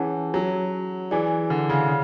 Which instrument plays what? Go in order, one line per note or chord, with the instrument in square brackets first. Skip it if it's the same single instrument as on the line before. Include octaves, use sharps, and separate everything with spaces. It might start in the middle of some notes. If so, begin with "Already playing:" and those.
Already playing: [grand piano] E3 [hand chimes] C#4 G#4 C#5 F#5 A5
[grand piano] F#3
[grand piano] E3 [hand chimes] E4 G#4 D5 G#5
[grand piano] D3
C#3
C#3